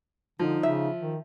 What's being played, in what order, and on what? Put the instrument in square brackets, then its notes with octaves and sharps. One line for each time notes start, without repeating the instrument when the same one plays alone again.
[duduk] D3 [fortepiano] F3 [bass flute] D#4
[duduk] C#3 [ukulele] E5
[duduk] D#3